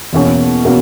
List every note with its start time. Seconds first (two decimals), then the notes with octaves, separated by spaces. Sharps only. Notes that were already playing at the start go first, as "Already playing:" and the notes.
0.13 E2 B2 A#3 C#4 F#4
0.65 B2 A#3 C#4 F#4